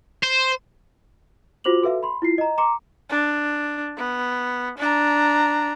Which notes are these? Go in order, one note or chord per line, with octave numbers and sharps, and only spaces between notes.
C5
F4 F#4 C5 D6 F7 F#7
F#4 A4 B4 E5 F5
B5 C6
E4 F4 C7
D#5 A#5
A#5 C6 D6 C#7
D4
B3
D4 A#5